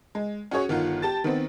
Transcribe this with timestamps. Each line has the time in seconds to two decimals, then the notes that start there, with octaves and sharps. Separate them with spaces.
0.15 G#3
0.51 C#4 F#4 G#4 C#5
0.69 G1 D#3 F4 F#5
1.02 G4 A5 A6
1.24 D#3 B3 C4